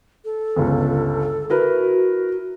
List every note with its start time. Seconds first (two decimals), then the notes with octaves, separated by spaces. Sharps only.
0.25 A4
0.56 G1 C#2
1.50 E4 F#4 A#4 B4